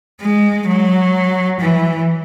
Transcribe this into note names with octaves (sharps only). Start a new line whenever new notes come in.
G#3
F#3
E3